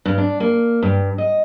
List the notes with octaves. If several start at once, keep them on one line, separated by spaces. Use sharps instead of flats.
G2
D4
A#3
G2
D#5